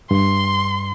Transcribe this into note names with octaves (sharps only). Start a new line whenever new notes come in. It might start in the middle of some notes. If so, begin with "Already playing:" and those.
G2 C6